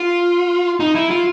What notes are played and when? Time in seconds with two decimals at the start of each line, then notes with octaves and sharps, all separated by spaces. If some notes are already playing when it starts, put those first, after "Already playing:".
Already playing: F4
0.80 D#4
0.95 E4
1.10 F4